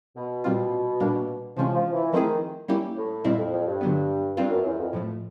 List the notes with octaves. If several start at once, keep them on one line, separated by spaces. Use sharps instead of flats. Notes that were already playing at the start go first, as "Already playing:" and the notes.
B2
A#2 G3 C4 F4
A#2 G3 A#3 D4
C3 E3 F3 G#3 C#4
F3
E3
D#3 F3 A3 C4 E4 G#4
G3 A#3 C#4 E4 G4
A2
F2 A#2 G3 C4 E4
F2
F2
G2
D3 F#3 B3
G2 G3 C4 F4
F#2
E2
F2
A2 F3 A3